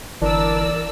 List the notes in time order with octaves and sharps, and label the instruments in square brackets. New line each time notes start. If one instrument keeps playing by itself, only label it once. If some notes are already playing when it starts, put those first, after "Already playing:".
[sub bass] G1 [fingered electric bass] E3 [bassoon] D4 [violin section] A#4 D5 E6